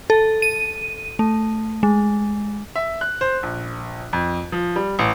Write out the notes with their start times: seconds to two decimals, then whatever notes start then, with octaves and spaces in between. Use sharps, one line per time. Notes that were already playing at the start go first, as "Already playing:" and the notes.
0.10 A4
0.42 D#7
1.19 A3
1.83 G#3
2.76 E5
3.01 F#6
3.21 C5
3.43 A#1
4.13 F2
4.52 F3
4.76 G3
4.99 A1